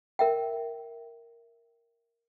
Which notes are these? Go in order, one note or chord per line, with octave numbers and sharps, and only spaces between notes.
A#4 E5 G5